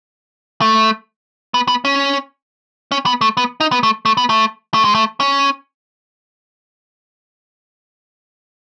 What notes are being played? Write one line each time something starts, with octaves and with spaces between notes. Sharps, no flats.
A3
B3
B3
C#4
C#4
B3
A3
B3
D#4
B3
A3
A3
B3
A3
A3
G#3
A3
C#4